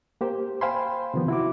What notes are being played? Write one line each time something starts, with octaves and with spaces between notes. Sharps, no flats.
A#3 G4 C5
C5 F5 G5 G#5 B5 C6
C3 D#3 F3 B3
E4 F#4 D6